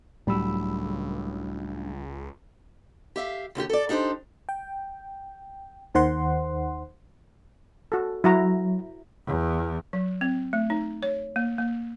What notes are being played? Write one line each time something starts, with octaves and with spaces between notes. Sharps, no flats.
C#2 A2 F#3 G3 D4 B5 E6
G4 E5 F5
D#2 D3 F4 G4
A4 D5
D4 D#4 G4 B4 C5
G5
D#2 D#3 C5 F#5 C6
F#4 A4
F#3 E4 F#4 A#5
E2
F#3
C4
A3
D#4
C#5
A#3
A#3